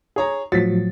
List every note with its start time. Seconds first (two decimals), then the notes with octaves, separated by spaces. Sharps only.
0.16 G#4 C#5 A#5
0.52 A2 F3 F#3 A6 B6